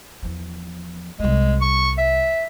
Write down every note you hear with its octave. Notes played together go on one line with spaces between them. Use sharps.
E2 F3
C2 G3 G#3
C#6
E5